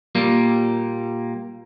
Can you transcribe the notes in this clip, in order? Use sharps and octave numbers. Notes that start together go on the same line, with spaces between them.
A#2 G3 A#3